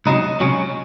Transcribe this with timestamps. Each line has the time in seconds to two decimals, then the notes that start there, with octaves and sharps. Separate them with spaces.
0.06 C#2 C3 F#3 D#4
0.40 C#2 C3 F#3 C#4